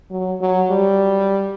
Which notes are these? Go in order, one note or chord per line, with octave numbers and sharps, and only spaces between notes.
F#3
F#3
G3